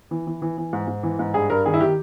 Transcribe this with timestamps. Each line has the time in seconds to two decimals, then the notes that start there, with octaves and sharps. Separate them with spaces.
0.11 E3
0.27 E3
0.42 E3
0.58 E3
0.73 G#2
0.88 G#2
1.03 E3
1.19 G#2
1.34 G2 G#4
1.50 G2 A#4
1.66 D#3 G#4
1.74 E4
1.81 D#3 G4